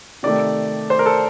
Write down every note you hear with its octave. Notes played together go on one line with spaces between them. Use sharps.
C3 D#3 A3 D5
C5
A#4
A4